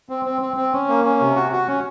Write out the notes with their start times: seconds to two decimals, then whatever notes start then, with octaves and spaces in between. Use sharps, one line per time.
0.09 C4
0.25 C4
0.42 C4
0.57 C4
0.73 C#4
0.89 A#3
1.05 C#4
1.20 C3
1.36 F#4
1.52 F#4
1.68 C#4